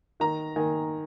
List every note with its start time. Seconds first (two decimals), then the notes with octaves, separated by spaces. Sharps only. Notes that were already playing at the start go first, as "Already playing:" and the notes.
0.20 D#3 A#5
0.56 D#3 G#5